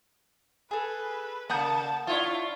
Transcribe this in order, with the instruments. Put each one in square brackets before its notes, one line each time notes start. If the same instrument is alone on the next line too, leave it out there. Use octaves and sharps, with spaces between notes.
[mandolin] G#4 A4 [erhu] B4
[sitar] C#3 A#3 [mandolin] F#5 D#6 G6 [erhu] A5
[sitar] D4 E4 F4 [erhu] C#5